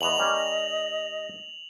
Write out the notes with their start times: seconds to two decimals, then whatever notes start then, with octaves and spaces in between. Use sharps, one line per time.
0.01 E2 B3 D#5 F7 F#7
0.19 G3 C#4 A#4